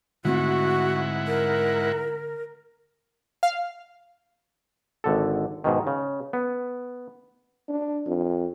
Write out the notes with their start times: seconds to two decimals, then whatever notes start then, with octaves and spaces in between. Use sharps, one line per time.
0.25 G#2 D3 A3 C4 E4 F#4 F#5
1.27 A#4
3.43 F5
5.04 G#1 D3 A4
5.64 G#2 B2 D#3
5.87 C#3
6.33 B3
7.69 D4
8.07 F2